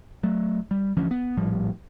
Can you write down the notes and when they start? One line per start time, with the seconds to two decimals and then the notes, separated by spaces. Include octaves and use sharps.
0.23 F#3 A3
0.71 G3
0.97 D2 E3 F3 C#4
1.11 B3
1.37 A#1 A2 F3 G3